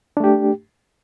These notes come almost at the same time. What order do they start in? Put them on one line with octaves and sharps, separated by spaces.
D4 A3 G4